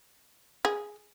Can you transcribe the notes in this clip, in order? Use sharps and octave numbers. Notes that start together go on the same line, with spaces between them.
G#4